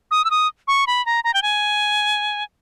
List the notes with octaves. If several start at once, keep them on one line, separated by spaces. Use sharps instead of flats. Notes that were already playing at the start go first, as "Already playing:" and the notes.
D#6
E6
D#6
C#6
B5
A#5
A#5
G5
G#5